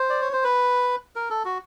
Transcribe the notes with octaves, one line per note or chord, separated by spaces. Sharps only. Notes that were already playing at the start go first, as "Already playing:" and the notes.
Already playing: C5
D5
C#5
C5
B4
A#4
A4
F#4